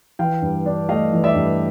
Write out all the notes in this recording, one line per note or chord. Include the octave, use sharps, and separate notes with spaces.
E3 F5 G5
G2
D4
A3 D#5 F5
E3
D5 E5
G2